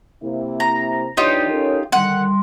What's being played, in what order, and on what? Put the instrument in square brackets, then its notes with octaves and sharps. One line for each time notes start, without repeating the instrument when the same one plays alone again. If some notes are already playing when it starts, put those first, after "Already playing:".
[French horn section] C3 A#3 E4
[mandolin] A#5
[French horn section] E3 D4 [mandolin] D#4 F4 G4 [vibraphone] C#5
[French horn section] C#4 A4 A#4
[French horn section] D3 D#3 [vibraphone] G3 C6 [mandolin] F#5